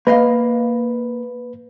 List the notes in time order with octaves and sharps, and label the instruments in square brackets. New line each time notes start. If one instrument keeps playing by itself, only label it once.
[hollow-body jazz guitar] A#3 D#5 F5 [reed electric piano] B4